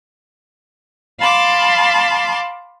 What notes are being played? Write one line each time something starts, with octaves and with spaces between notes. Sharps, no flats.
F5 A5 B5 C6 D6